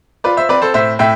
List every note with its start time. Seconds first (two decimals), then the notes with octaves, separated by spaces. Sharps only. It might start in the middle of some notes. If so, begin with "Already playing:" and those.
0.24 F4 B4 D5
0.37 C5 E5
0.49 C4 B4 D5
0.62 A4 C5
0.74 A2 C5 E5
0.99 A2 E5 G5